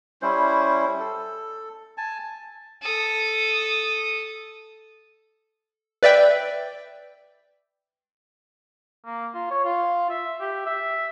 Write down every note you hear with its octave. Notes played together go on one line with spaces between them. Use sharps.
G3 C#4 E4 C5
A4
G#5 A5
A4 D#6
B4 D5 E5 G5
A#3
F4
C#5
F4
E5
G4
E5